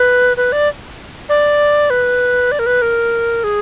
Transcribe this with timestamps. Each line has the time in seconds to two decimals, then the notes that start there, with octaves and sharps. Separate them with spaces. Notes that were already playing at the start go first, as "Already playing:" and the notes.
Already playing: B4
0.37 B4
0.52 D5
1.29 D5
1.90 B4
2.52 D5
2.59 A#4
2.66 B4
2.82 A#4
3.44 G#4